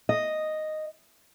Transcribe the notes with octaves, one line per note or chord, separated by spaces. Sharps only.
D#5